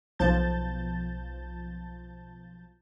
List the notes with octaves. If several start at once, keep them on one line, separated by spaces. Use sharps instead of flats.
B1 F3 A5 G6 A6